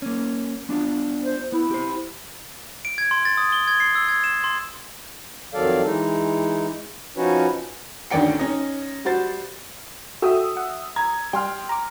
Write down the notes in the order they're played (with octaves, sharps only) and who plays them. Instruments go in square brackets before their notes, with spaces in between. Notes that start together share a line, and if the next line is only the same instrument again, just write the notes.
[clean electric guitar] A#3 C#4
B3 D4 F4
[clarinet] C5
[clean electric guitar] B3 [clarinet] E4
[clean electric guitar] G4 C5
[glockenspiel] D7
G#6
C6
A6
D#6
G7
G#6
C7
E6
G#6
E7
C6
[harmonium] F2 D#3 F#3 A4 D5 F5
E3 G#3 D#4
F3 C#4 D#4 F#4 B4 C#5
[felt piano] D2 D#3 C#4 D5 G5 C#7
C#4 D#4
G3 F#4 C5 A6
[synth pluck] F#4 A4 G5 [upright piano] E5 D#6 E6
[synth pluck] F#5
[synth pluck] A#5 [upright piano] G#6
[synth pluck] G3 [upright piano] G5 C6 F6
[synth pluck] A#5 D6